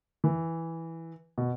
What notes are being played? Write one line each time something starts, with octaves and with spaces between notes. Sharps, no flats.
E3
B2